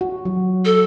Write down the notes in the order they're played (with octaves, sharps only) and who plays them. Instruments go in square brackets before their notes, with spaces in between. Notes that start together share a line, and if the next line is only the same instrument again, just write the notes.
[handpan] F#4
F#3
[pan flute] A4